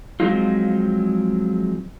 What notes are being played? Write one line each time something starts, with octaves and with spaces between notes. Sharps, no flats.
F3 F#3 G#3 C4 D#4 F4